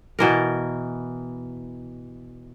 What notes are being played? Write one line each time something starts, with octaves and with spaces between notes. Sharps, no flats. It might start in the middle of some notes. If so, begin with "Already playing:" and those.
B2 E3 A#4